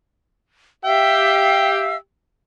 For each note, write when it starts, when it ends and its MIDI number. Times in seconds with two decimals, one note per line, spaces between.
0.85 1.95 67
0.85 1.96 76
0.85 1.96 77
0.85 1.95 79
0.85 1.96 88